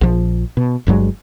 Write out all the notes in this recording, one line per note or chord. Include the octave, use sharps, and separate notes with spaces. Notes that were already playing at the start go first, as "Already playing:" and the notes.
A#1 F3
B2
G1 G2 F#3 G#3